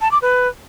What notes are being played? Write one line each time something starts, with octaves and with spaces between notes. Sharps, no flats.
A5
D6
B4